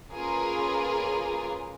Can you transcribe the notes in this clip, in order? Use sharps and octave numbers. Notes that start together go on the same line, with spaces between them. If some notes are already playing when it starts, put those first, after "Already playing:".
A#3 C#4 F4 G#4 A#4 B4